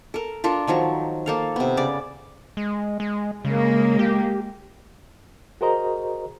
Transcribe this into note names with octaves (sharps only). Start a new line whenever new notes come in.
A4 A#4
D4 F4 A4 A#4
D#3 F3 F#3 C#6
A#3 A4 F5
C3 B3
C#3 D5 D6
G#3
G#3
C#3 G#3 A#3
G4
F#4 G#4 A#4 C5 D#5 A#5